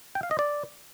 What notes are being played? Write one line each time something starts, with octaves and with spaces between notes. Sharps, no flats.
G5
F5
D#5
D5